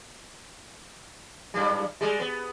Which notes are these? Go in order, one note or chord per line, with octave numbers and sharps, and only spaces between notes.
F#2 G3
G3 G#3
B3